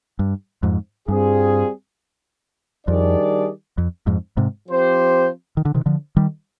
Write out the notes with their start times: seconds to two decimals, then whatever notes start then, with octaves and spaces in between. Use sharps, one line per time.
0.19 G2
0.63 F2 G#2
1.08 G2 G3 C4 F4 G#4
2.87 F2 D#3 G3 D4 G#4 D5
3.78 F2
4.07 F2 G#2
4.37 G#2 C3
4.68 F3 C4 G4 C5
5.57 D#3
5.65 D3
5.74 C3 D#3
5.86 D3 F3
6.16 D#3 G3